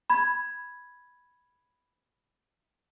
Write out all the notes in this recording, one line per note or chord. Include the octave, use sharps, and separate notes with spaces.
B5 G#6